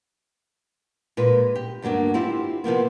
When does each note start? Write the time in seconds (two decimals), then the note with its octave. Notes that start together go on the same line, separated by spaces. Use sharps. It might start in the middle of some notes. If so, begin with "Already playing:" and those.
1.17 A#2 G#3 B4
1.55 G4
1.82 D2 G2 F#3 A#3 D4
2.14 C4 E4 F4 G4
2.64 C3 F3 A#3 B3